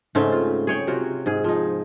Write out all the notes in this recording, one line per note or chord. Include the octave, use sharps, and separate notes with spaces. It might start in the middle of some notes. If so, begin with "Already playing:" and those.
G#2 C#3 A3 C4
F4
G#4 C#5 G5
C3 F4 F#4
G#2 G#4
F3 D#4